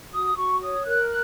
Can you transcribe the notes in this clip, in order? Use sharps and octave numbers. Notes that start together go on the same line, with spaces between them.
F#4 D#6
F#4 C#6
C#5 D#6
A#4 F#6
F#6